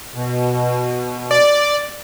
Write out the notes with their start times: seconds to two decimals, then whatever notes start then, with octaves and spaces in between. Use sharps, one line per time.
0.15 B2
1.31 D5